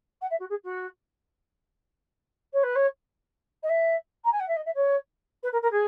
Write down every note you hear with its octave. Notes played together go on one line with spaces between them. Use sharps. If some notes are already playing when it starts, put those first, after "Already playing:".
F#5
E5
F#4
G#4
F#4
C#5
B4
C#5
D#5
E5
A#5
G#5
F#5
E5
D#5
E5
C#5
B4
A#4
A#4
G#4